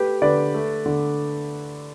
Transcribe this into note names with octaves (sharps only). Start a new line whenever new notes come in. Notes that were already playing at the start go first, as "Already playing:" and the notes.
Already playing: A3 G4 B4
D3 B4 D5
A3
D3